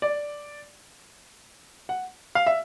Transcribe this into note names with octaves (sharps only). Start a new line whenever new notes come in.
D5
F#5
F5
E5